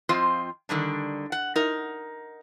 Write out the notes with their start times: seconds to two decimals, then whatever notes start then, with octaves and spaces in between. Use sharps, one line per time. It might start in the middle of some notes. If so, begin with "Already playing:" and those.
0.09 F2 C4 F4 C5 D#5
0.69 D3 D#3 G3 D4
1.32 F#5
1.56 D#4 A#4